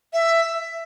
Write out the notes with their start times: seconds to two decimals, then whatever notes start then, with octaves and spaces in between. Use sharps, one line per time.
0.13 E5